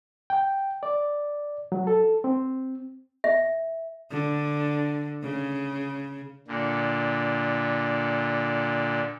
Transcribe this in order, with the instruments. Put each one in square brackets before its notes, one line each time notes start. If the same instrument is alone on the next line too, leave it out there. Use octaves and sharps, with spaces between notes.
[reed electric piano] G5
D5
F#3
A4
C4
[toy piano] E5
[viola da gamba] D3
C#3
[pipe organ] A#2 D3